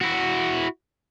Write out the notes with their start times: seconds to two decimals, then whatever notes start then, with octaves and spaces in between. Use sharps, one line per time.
0.01 E4 F#4